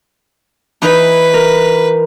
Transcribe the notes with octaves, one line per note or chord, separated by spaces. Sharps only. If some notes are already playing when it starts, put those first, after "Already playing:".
E3 D#4 B4
A#4